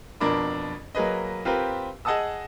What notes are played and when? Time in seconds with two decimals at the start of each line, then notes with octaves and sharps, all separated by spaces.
0.21 F2 B2 D4 A#4 B5 D6
0.95 F#3 A#3 G#4 B4 D#5
1.45 C4 F4 G4 A#4 B4
2.05 G#4 D#5 F#5 A5 D#6 E6